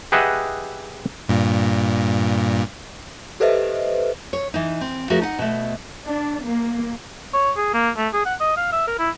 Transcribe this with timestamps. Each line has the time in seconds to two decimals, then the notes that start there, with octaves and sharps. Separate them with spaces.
0.12 G4 G#4 B4 D#5 E5 F#5
1.29 G2 A#2
3.40 G4 A4 B4 C5 D#5 E5
4.33 C#5
4.54 E3 D#4
4.81 C4
5.10 F3 A3 F#4 G#4 A#4
5.22 D#4 F#5
5.39 B2 A3
6.05 D4
6.42 A#3
7.33 C#5
7.57 G#4
7.74 A#3
7.97 A3
8.13 G#4
8.25 F#5
8.40 D#5
8.56 F5
8.72 E5
8.87 A#4
8.99 E4